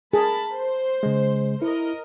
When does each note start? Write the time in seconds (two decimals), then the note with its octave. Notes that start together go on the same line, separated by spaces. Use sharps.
0.13 G#4 A#4 A5 B5
0.54 C5
1.03 C#3 G#3
1.62 E4 A#4 D#5